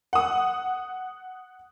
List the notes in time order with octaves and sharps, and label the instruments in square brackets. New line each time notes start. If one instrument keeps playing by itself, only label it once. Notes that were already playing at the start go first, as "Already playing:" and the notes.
[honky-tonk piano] F#5 D#6